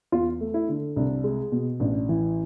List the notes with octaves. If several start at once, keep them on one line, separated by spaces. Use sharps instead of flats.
E2 F4
A3
E4
D3
C2 D4
G#3
B2
A1 D4
E3